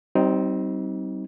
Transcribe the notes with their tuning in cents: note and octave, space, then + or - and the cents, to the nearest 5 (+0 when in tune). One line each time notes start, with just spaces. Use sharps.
G3 -30 C4 +0 D#4 +15